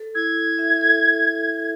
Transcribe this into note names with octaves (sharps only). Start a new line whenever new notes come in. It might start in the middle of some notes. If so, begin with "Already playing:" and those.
Already playing: A4
E4 G#6
E4
E5
A4